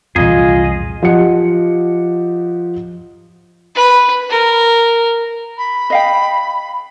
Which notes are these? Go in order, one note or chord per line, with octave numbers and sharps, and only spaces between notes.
C2 F2 A#2 E3 C4 F4 G#4 D#5
F3 G4 D#5 F#5 C#7
B4
A#4
B5
D#5 F5 G5